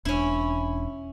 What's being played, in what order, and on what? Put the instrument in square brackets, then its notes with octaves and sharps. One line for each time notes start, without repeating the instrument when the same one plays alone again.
[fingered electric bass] E1 D4 [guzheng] C#4 E4